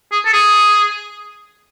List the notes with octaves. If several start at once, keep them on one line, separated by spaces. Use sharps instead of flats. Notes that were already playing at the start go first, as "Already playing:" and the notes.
G#4
A4
G#4